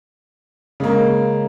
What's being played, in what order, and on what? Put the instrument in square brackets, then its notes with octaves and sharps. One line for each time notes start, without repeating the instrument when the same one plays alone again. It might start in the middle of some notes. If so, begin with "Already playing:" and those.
[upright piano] C#3 G#3 A#3